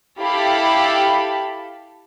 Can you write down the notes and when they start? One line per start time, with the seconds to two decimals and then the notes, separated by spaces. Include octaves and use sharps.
0.20 E4 G4 A4 F5 A5 B5